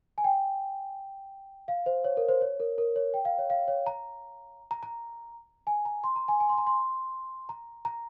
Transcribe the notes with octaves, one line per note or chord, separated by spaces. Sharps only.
G#5
G5
F5
C5
C#5
A#4
C5
C#5
A#4
A#4
C#5
G5
F5
C#5
F5
C#5
A#5
A#5
A#5
G#5
A#5
C6
A#5
G#5
G#5
C6
G#5
A#5
C6
A#5
A#5